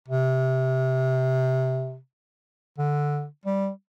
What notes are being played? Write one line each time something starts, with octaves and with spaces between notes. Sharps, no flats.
C3
D3
G3